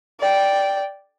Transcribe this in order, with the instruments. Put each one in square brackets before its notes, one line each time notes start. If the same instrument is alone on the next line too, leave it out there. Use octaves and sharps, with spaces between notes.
[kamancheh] D5 G5